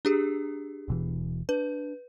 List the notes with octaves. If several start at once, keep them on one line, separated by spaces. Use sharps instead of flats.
D4 G4 G#4
D#1 B2 E3
D4 B4